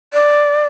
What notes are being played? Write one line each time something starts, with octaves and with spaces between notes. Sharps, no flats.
D5